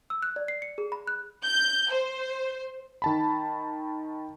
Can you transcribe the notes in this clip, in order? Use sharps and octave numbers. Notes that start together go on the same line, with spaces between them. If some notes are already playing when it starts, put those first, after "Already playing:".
E6
F#6
D5
C7
C#7
G#4
B5
F#6
G6
C5
D#3 A5 B5